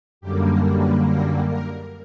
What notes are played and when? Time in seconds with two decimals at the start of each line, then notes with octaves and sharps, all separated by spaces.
0.21 F#2 D3 G3 A#3 G4
0.49 A#4
0.77 B4
1.05 A#4
1.47 A#4